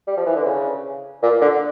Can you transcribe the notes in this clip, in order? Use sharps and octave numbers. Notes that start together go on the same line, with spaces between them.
G3
F3
E3
D3
C#3
A#2
D3